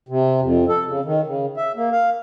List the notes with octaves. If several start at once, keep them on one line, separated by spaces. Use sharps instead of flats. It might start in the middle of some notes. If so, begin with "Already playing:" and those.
C3
F2
A4
C#3
D#3
C#3
E5
A#3
F5